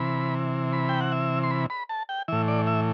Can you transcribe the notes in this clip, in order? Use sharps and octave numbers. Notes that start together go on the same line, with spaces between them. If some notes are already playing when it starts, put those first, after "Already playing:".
Already playing: C3 E3 B5
B5
G5
F#5
E5
C6
B5
B5
A5
G5
A2 E3 E5
D5
E5